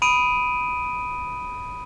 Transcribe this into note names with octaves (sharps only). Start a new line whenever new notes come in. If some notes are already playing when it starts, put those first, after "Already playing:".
B5 D#6 D7 D#7